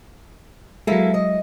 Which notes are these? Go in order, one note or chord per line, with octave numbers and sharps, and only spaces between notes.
F#3 G#3 A#3 E4 A4
D#5